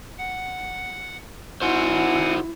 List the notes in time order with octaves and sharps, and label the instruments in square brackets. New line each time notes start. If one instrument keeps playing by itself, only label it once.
[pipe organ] F#5
[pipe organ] C4 F#5 G#5 [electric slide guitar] D#4 F#4 C5 [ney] E4